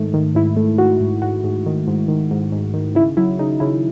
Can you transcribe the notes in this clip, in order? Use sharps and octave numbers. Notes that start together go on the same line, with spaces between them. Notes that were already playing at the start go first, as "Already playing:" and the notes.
Already playing: G#2 D#3 A3
D#3
G#2 E4
A3
D#3 F#4
G#2
G#2 F#4
G#2
D#3
G#2
D#3
G#2
G#2
D#3
C#3 E4
F#3 E4
C#3 D#4
C#3 E4